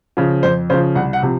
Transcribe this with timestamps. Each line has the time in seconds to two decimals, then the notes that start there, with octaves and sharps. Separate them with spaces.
0.17 C#3 F3
0.43 F2 C5
0.70 C#3 F3 C5
0.95 C2 F#5
1.13 F#5
1.23 C3 F3